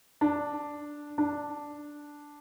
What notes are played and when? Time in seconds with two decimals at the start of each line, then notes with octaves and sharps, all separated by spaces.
0.21 D4
1.18 D4